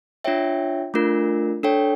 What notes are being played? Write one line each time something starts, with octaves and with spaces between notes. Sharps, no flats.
D4 F4 C#5 E5 G5
A3 D4 F4 A#4
D4 A4 C#5 G5